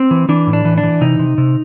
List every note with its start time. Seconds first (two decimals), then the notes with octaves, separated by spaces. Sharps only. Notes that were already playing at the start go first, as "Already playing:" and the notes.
Already playing: C4
0.11 E3
0.29 E3 D4
0.47 A2
0.53 D4
0.65 E3
0.78 D4
0.83 E3
1.01 C3 D#4
1.19 C3
1.38 C3